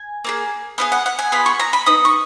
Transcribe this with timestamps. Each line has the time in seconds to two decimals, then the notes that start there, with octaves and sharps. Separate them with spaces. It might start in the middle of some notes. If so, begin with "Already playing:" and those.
Already playing: G#5
0.25 A#3 F4 G#4
0.78 B3 D#4 G#4 F5
0.92 F#5
1.06 F#5
1.19 G#5
1.32 B3 F4 G#4 B5
1.46 C#6
1.59 A#5
1.73 B5
1.86 B3 D#4 D#6
2.05 C#6